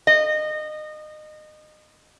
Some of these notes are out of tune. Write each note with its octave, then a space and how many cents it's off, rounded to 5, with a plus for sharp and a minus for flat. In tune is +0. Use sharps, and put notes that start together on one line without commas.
D#5 -25